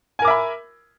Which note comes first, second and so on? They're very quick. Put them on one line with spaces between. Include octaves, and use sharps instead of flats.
G#5 A#4 D6 E5 B5